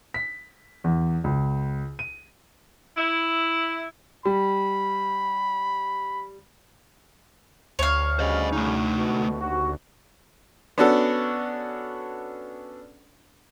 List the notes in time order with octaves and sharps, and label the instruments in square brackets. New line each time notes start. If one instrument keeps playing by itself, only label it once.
[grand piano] B6
E2
C#2
D#7
[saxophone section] E4
[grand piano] G3 [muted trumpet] B5
[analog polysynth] D2 [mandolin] C#5 F5
[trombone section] C#3 G3 [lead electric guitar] C5 D#5
[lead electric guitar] A3 D#4
[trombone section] G#1 B2 F#4
D#2 F#4
[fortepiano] B3 C#4 D4 F#4 A4